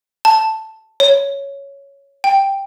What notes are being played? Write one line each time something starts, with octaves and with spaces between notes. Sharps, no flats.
A5
C#5
G5